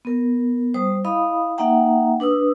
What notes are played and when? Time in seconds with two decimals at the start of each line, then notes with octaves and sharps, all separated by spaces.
0.05 B3 A#4
0.74 G3 C5 D#6
1.05 E4 D#5 F5 B5 D#6
1.58 A#3 D#4 E5 F#5 G5 A#5
2.20 D4 B4 D#6 E6